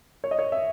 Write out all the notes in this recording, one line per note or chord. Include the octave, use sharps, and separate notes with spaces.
C#5
D#5
C#5
E5